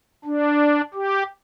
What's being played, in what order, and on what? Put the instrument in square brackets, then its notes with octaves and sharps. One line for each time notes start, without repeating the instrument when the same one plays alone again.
[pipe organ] D4
G4